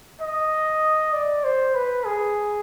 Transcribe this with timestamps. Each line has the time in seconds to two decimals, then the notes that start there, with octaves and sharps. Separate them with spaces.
0.21 D#5
1.13 D5
1.44 C5
1.75 B4
2.06 G#4